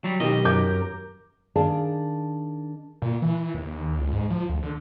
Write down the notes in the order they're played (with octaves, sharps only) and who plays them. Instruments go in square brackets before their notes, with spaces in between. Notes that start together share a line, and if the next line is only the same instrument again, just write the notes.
[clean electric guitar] F#3 G3
[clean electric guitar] B1 B2 D#5 [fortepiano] D#3 G4
[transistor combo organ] F#2 A#4 [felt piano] D6 G6
[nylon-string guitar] D#3 D4 G#4 D5 F5 A5
[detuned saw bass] A#2
E3
D#2
C#2
G#2
F3
D2
D3